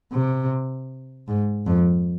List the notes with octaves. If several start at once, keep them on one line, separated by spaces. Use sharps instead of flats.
C3
G#2
F2